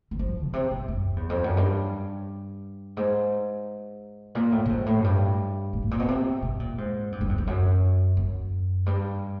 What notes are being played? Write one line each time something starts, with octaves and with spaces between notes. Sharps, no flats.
E3
F3
B2
C3
B2
F#2
E2
F2
F#2
G2
G#2
A#2
A2
A2
G#2
A2
F#2
G2
G#2
A2
A#2
B2
C3
B2
A#2
G#2
G2
F2
E2
F2
F#2
F#2
G2